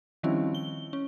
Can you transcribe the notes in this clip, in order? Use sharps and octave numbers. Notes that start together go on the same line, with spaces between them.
D#3 F3 G3 C4 C#4 E4
G7
C#4